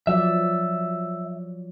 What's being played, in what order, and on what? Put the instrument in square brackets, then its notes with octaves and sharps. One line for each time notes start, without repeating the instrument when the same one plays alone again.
[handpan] F3 F#3 D5 [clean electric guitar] E5